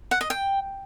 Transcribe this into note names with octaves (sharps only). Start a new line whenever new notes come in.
F#5
D#5
G5